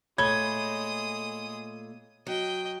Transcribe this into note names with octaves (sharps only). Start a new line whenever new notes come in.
A#2 G#3 A3 C#5 B5 D#6 G#6 G7
F#3 D#5 G5